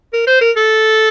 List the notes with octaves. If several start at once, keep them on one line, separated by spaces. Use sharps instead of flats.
A#4
C5
A#4
A4